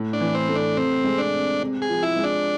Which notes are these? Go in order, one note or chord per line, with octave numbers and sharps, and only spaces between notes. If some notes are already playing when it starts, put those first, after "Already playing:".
Already playing: A2
D4
E3
C4
A3
D4
C3 C4
G#3
D4
C4
C3
G#4
F3
E4
G#3
D4